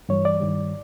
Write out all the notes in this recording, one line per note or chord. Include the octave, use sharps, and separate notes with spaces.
G2 E3 G3 C#5
D5
G2 D#3 G3